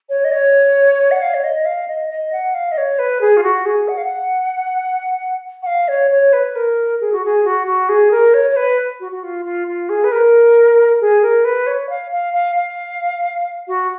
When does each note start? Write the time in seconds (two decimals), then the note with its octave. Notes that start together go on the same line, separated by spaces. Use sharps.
0.09 C#5
0.24 D#5
0.32 C#5
1.11 F#5
1.22 F5
1.34 C#5
1.44 D#5
1.65 F5
1.88 D#5
2.10 D#5
2.32 F#5
2.54 F5
2.72 D#5
2.78 C#5
2.99 B4
3.21 G#4
3.37 F4
3.43 F#4
3.65 G#4
3.88 F#5
3.97 F5
4.05 F#5
5.63 F#5
5.66 F5
5.88 C#5
6.11 C#5
6.33 B4
6.55 A#4
7.01 G#4
7.12 F#4
7.25 G#4
7.44 F#4
7.67 F#4
7.89 G#4
8.11 A#4
8.34 C#5
8.50 C#5
8.56 B4
9.00 F#4
9.12 F#4
9.23 F4
9.45 F4
9.68 F4
9.89 G#4
10.04 B4
10.12 A#4
11.01 G#4
11.22 A#4
11.45 B4
11.67 C#5
11.89 F5
12.12 F5
12.34 F5
12.56 F5
13.68 F#4